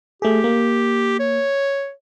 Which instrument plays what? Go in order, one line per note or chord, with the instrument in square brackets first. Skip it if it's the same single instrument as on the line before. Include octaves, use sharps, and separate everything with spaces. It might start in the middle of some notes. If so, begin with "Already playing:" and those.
[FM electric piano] A3 G#4 [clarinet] G4
[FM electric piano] A#3
[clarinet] C#5